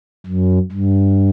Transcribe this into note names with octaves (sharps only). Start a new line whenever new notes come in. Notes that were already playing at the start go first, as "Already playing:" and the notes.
F#2
G2